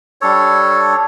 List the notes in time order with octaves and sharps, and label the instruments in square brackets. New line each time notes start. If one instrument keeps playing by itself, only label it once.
[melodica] G3 D4 A4 C#5